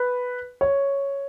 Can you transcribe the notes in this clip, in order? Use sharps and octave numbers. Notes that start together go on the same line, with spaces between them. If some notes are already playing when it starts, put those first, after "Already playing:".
Already playing: B4
C#5